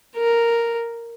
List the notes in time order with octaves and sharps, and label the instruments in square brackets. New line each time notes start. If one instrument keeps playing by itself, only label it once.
[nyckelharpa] A#4